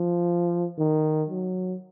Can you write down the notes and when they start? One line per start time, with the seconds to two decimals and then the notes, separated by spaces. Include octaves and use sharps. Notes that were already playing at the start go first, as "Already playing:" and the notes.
Already playing: F3
0.78 D#3
1.29 F#3